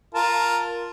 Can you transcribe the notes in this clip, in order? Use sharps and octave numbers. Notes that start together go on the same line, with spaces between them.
F4 A#4 A5